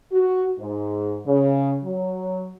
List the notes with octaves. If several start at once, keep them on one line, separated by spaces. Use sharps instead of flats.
F#4
G#2
C#3
F#3